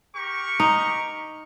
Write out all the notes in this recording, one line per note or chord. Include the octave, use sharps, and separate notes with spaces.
G4 A#4 C#6
D#4